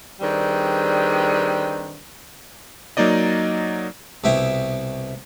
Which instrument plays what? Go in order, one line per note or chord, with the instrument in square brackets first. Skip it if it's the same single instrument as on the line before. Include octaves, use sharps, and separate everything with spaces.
[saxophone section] D#3 G3 C4 D4 G#4 B4
[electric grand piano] F#3 A#3 D#4 D5 D#5
[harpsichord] C2 B2 E4 E5 G5 A#5